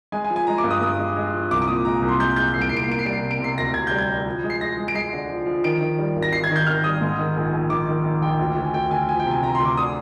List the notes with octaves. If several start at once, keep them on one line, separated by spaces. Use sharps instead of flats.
G#3 G#5
G#5
F3
G#5
G#3 A#5
D6
G2
D#6
G2 D#6
G#3
G#3
F3
C2 D6
D6
A#2 D#6
G#3 A#5
C2
C6
G#3 G6
G#3 G6
C2 C7
D7
C2 C7
D7
C7
A#3 D7
C7
G3 D7
C7
C3
D7
C3 C7
D2 A#6
C3 G#6
G3 G6
G#6
G3
F3
G#3
C7
G#3 A#6
G#3
D7
G#3 C7
D3
F3
F3
D#3 D7
D#3
G3
G#1
A#6
D#3 C7
G#6
D#3
G6
D#3 F6
G3 D#6
G#2
D#3
A#1
A#1
D#3 D6
D#3
D#3
A#1 G5
D2
D2
G#5
D2 G5
D2 G#5
F3 G#5
G5
C3
G#5
D2 A#5
C6
D2
D6
D3 D#6